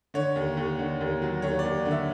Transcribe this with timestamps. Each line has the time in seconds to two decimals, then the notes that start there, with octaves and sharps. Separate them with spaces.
0.14 D3 C#5
0.36 D#2
0.57 D#2
0.79 D3
1.01 D#2
1.22 F#3
1.42 D#2 C#5
1.59 D5
1.65 D#2
1.85 D3
1.91 E5